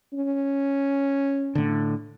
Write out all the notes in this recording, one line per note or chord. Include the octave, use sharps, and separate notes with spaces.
C#4
A2 D3